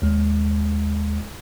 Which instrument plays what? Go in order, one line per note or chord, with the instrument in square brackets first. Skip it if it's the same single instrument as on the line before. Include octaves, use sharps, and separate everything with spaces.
[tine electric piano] D#2 G#3